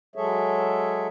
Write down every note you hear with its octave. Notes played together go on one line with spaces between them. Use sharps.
F#3 G#3 G#4 A4 C#5 E5